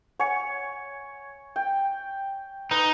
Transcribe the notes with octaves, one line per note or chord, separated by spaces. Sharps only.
C#5 F#5 G#5 C#7
G5
D#4 B4